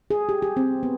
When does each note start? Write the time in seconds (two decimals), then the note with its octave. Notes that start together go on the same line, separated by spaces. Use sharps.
0.11 G#4
0.29 G4
0.42 G4
0.57 C4
0.83 B3